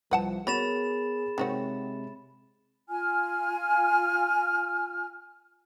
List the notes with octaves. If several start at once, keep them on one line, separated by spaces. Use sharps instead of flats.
C2 F3 B4 F#5 A5
B3 F#4 G#4 A#4 C#5 B5 A6 E7
C3 D#3 G#3 C4 F#4 C#5
F4 G#5 F6